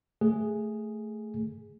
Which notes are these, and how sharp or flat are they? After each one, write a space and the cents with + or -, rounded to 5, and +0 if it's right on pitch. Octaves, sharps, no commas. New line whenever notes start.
A3 +0 G#4 +0